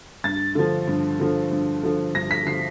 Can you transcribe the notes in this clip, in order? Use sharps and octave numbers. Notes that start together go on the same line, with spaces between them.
G2 A6
D3 F3
G2
D3 F3
G2
D3 F3
G2 A#6
B6
D3 F3 C7